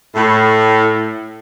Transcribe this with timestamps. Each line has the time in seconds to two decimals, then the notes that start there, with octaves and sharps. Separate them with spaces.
0.15 A2